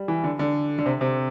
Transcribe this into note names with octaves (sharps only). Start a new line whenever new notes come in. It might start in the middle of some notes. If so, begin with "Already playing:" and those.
Already playing: G3
E3
D3
D3
D3
C3
C3